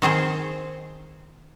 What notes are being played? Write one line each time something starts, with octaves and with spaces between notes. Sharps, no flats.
D#3 C4 G#4 C5